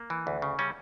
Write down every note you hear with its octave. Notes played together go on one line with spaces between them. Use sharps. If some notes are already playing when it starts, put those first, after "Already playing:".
Already playing: A#3
E3
D2
C#3
G3 C#4